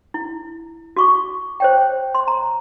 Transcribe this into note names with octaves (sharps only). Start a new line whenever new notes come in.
E4
F#4 C#6 D6
C5 C#5 G5
C6
A#5